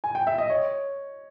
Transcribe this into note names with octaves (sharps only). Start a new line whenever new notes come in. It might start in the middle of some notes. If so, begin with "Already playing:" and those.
G#5
G5
E5
D#5
C#5